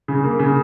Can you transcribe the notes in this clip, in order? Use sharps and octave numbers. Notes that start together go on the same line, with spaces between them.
C#3
A#3
C#3